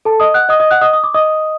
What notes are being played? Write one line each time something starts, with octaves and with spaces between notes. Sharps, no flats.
A4 A5
D#5 D#6
F#5 F#6
D#5 D#6
D#5 D#6
F#5 F#6
D#5 D#6
D#6
D6
D#5 D#6